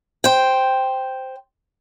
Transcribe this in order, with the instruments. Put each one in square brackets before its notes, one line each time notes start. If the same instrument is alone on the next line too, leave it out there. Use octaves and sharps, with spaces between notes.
[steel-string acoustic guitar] C5 G5